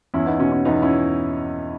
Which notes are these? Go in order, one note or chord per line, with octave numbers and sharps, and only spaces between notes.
E2 C#4 E4
B3 D#4
B2 C#4
C#4
E2 B3 D#4
C#4 E4